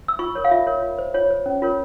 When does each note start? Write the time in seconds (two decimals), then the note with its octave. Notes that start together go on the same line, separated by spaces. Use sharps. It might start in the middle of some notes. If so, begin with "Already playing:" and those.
0.08 E6
0.19 F4 C#6
0.35 A#4 C#5
0.44 F5
0.51 F4 E5
0.67 A#4 C#5
0.82 F4
0.98 C5
1.14 F4 C#5
1.30 C5
1.46 C#4
1.62 F4 A#4 C#5